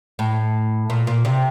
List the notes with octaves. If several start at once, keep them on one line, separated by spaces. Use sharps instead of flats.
A2
A#2
A#2
C3